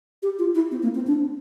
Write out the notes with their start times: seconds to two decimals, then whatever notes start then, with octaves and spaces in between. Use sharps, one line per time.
0.23 G4
0.39 F4
0.55 E4
0.71 C4
0.83 A#3
0.95 C4
1.07 D4